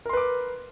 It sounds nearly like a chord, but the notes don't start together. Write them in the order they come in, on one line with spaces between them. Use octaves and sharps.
A#4 C6 B4 D6